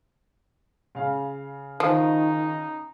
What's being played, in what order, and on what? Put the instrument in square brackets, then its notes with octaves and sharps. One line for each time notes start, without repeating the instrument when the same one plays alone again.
[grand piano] C#3 F5
[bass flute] D#3 [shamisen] F3 [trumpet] D#4